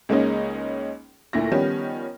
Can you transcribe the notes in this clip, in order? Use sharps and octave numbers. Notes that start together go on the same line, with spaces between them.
C#2 G#3 A#3 C#4 D#4
D2 A#2 E4 A#6
D#3 F3 G3 B3 C#4